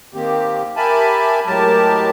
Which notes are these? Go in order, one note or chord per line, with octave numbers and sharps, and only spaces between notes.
D#3 A#3 C4 G4
G4 A#4 E5 G#5 A5 B5
A2 F#3 G#3 G4 A#4 A5